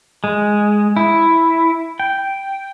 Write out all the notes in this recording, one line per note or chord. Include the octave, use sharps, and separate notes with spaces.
G#3
E4
G5